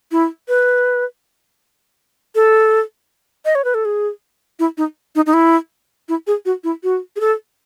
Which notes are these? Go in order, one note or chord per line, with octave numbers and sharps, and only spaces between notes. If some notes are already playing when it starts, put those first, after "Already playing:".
E4
B4
A4
D#5
C#5
B4
A4
G#4
E4
D#4
D#4
D#4
E4
E4
G#4
F#4
E4
F#4
G#4
A4